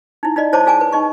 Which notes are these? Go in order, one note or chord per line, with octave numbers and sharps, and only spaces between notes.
D#4 E4
D#4 F4 D5 D#5
E4 C5 C#5 A5 B5 D6
F4 G#4 G#5 A5 D6
B4
D#4 D#5 C#6